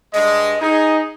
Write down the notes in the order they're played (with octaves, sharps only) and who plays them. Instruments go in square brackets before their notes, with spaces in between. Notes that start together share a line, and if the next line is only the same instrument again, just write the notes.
[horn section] G2 G#3 [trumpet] D#5
[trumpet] D#4 [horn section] G#4